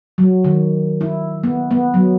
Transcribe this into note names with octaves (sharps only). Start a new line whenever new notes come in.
F#3
D#3
E4
B3
B3
F#3